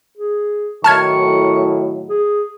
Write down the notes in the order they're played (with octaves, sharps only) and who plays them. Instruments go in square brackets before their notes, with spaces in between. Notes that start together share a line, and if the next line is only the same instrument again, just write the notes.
[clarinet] G#4
[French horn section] A2 D#3 F#3 [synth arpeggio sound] A5 F6 G#6 [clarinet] C#6
[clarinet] G#4